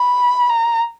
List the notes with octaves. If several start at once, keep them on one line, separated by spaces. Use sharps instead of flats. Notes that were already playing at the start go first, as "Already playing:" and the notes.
Already playing: B5
A#5